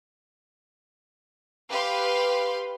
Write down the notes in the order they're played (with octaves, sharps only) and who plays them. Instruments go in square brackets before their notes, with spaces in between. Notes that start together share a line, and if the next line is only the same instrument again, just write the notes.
[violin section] G4 B4 F5 C6